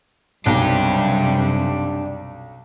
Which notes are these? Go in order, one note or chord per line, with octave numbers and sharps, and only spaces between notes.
B1 F#2 C3 G3 D4 G4